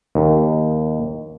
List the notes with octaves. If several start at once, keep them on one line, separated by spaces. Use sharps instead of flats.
D#2